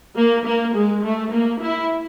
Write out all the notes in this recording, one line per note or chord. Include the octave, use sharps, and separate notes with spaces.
A#3
A#3
G#3
A3
A#3
E4